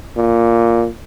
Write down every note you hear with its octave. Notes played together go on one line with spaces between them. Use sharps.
A#2